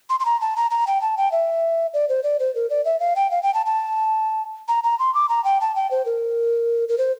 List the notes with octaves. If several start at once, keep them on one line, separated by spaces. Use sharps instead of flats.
C6
C6
A#5
A5
A#5
A#5
G5
A5
G5
E5
D5
C5
D5
C5
A#4
D5
E5
F5
G5
F5
G5
A5
A5
A#5
A#5
C6
D6
A#5
G5
A5
G5
C5
A#4
A#4
C5